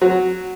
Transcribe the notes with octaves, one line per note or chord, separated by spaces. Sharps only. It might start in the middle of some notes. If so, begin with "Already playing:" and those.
F#3